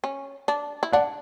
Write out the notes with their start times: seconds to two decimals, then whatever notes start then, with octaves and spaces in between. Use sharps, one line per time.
0.04 C#4
0.48 D4
0.83 E4
0.93 D4 D5 F#5